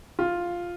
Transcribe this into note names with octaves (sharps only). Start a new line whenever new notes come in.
F4